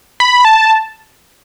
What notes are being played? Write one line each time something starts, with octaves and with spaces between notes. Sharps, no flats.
B5
A5